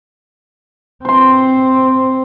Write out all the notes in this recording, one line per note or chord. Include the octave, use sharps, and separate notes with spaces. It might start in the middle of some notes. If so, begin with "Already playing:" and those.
C4 C5 C6